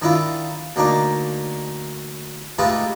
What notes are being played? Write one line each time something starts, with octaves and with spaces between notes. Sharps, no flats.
D#3 D4 E4 F4
D2 A#3 D4 D#4 D6
G#3 A3 D#4 F4 G4 B4